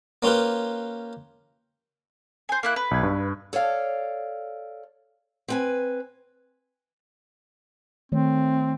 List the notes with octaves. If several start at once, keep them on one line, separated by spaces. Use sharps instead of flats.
A#3 C#4 F4 G4 B4
C5 G#5
A#3 E4 F#6
B4
B1 G#6
G2
A4 C#5 D5 F5
C4 B4 G#5
D#3 A3 C4 C#5